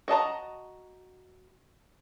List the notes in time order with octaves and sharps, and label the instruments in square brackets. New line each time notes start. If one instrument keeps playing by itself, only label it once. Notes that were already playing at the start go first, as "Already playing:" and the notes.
[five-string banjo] F#4 D#5 A5 A#5